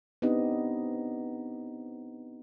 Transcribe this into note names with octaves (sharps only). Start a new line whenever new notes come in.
B3 C4 D4 D#4 G4 D#5